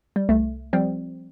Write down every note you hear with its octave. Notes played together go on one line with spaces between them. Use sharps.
G3
C2 A3
F3 G3 C4